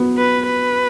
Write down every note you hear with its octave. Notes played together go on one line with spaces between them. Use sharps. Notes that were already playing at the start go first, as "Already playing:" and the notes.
Already playing: F#3 B3
B4
B4